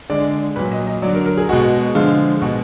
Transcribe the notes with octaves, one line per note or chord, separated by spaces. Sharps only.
D3 G#3 D5
A#2 F#3 B4
D#5
D#5
D3 F#3 D5
A#4
A#4
G#4
B2 G#3 F#4
D3 F3 G#3 F4
B2 G#3 F#4